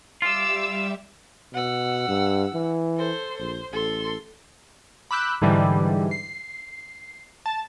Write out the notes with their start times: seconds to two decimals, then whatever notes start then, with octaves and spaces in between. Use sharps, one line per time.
0.22 G3 F4 E5 D6 E6
1.53 B2 F#5 E6
2.08 G2
2.54 E3
2.97 A4 C5
3.39 A#1 C5
3.72 A1 A4 C6
5.11 B5 D6 E6 F#6 G6
5.42 G#2 D3 E3 G3
6.11 C7
7.46 A5